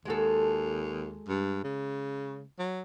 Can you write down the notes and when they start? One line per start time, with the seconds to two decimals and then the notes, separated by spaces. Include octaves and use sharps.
0.05 D#2 G#3 F#4 A4
1.29 G2
1.64 C#3
2.59 F#3